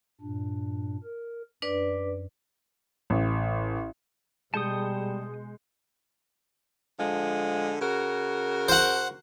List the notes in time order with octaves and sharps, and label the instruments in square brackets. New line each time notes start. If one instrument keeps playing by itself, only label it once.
[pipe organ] G2 A#2 D4
A#4
[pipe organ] F#2 [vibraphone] D4 B4 D5
[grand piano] A1
[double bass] B2 [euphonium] G3 [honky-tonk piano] G#3 G6 C#7 [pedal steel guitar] A5 D#6
[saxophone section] D3 F3 G#3
C#3 F#4 A#4
[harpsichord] C5 F#5